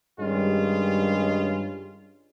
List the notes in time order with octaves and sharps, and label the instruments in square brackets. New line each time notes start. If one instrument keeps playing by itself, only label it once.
[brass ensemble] G2 D#3 G3 G#3 C#4 F4